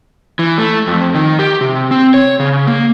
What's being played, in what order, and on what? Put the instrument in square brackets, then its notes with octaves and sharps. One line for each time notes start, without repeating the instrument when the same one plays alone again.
[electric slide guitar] E3
A3
F2
D#3
G4
C3
C4
C#5
C#3
A#3